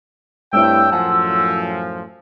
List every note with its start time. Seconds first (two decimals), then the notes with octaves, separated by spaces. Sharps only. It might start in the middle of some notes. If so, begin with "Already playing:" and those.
0.53 G2 A3 C4 E4 C#5 G5 E6
0.92 F#2 A2 F3 F#5 G#5 A5